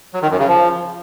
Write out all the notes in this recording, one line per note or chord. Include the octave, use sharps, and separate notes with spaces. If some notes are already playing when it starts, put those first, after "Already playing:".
F#3
D#3
F#2
C#3
F3